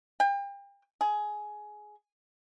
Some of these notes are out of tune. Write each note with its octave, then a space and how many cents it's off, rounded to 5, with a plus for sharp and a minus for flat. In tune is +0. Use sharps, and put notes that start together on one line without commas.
G5 +35
G#4 +15